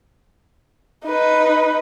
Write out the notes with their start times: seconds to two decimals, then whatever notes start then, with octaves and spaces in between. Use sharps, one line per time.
1.06 D#4 B4